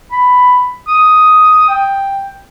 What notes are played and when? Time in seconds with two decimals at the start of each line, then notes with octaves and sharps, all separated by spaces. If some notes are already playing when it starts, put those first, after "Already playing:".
0.11 B5
0.88 D#6
1.69 G5